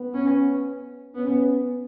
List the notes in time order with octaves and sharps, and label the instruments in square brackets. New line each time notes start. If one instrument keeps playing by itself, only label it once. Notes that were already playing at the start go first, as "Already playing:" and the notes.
Already playing: [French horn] B3
[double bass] C#4
[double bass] B3 [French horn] C#4